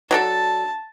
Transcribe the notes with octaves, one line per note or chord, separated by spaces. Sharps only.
F#3 D4 A4 A5